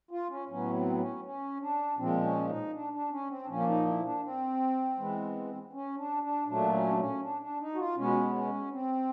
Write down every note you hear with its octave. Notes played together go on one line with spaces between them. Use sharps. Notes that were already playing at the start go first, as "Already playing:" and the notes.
F4
C#4
A2 F#3 B3 C#4
C4
C#4
C#4
D4
A#2 F3 G#3 C4
C#4
D#4
D4
D4
C#4
C4
D4
A#2 F3 A#3 C#4
D4
D#4
E4
D4
C4
E3 G#3 B3
C#4
D4
D4
A#2 F#3 A3 D4
C#4
D4
C#4
D4
D4
D#4
F#4
F4
B2 G#3 B3 C#4
C#4
C4